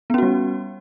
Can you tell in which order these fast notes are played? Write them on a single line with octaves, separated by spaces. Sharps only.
B3 C#4 F#4 G3